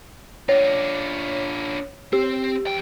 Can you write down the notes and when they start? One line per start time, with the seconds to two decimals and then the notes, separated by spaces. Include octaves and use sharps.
0.49 D4 F4 C#5
2.13 C4 G4
2.67 E2 G5